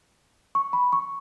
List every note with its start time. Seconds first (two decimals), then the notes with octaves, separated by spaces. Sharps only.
0.55 C#6
0.73 B5
0.93 C#6